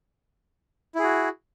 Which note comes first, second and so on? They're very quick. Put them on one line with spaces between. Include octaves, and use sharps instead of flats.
E4 G#4 F#4